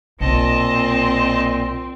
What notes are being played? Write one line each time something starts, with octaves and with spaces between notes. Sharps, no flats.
B1 A#2 C4 D#5 A5